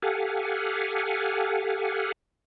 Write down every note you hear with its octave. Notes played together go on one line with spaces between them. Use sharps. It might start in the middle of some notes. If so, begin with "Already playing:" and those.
G4 A4 F5 F#5 G#5